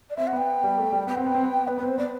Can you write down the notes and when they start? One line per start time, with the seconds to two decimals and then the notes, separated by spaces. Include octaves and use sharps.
0.10 D5
0.17 C4 E5
0.27 F#5
0.33 B3 G5
0.64 G3
0.78 A3
0.92 G3
1.07 B3 G5
1.15 C4 F#5
1.24 B3 G5
1.35 C4
1.43 B3
1.67 B3 B4
1.78 B3 B4
1.83 C4
1.88 C5
1.98 B3 D5